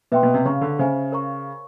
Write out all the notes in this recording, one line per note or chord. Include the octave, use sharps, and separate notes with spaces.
B2 B4 E5 G5 C6
B2
C3
C#3 C#5 F5 A#5 C#6
D3
C#3 G#4 C5 E5 G#5
A#4 C#5 F5 A#5 C#6